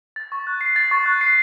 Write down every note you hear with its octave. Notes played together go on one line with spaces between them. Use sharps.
A6
C#6
F#6
C7
A6
C#6
F#6
C7